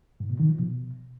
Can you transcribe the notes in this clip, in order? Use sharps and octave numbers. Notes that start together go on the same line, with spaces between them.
G#2
B2
D#3
F3
B2